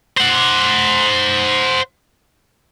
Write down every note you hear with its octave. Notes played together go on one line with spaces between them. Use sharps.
C5 F#5